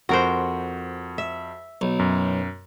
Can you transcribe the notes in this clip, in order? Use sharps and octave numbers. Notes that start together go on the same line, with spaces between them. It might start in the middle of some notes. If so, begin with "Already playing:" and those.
F2 F#4 A#4 C5
E5
B1
F#2